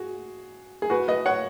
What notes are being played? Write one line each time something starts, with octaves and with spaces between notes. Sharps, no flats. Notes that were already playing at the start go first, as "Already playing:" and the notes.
Already playing: F#4 G#4
G#4
F#4 B4
B4 D#5
C#5 F#5